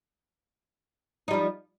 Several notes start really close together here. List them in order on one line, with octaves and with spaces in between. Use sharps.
D#4 G3 F3